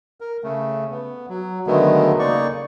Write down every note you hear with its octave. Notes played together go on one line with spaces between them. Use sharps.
A#4
C#3 A3
B3
F#3
D3 D#3 F#3 G#3 A3 B3
C#3 A#3 D#4 D5 C#6